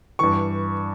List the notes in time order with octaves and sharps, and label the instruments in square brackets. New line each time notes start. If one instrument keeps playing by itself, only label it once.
[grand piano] G2 E3 C#6